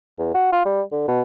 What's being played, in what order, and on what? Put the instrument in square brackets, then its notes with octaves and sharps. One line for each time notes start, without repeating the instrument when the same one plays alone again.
[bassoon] E2
F#4
F4
G3
D3
B2